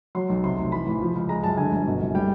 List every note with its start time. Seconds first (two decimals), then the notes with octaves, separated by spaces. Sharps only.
0.15 F#3 C6
0.29 B1
0.43 C3 C6
0.58 F1
0.72 E3 B5
0.86 A1
1.01 F3
1.15 C#2
1.29 G#3 A#5
1.44 F#2 A5
1.57 D3 G#5
1.72 G1
1.86 B2
2.00 F#1
2.15 G3 G5